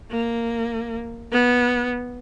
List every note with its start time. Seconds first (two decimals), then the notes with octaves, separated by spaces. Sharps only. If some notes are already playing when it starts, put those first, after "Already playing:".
0.11 A#3
1.32 B3